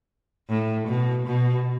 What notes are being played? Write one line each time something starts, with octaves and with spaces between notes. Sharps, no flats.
A2
B2
B2